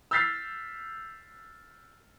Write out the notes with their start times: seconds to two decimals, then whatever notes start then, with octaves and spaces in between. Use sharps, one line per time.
0.11 E6 F6 G6 A6 B6 C7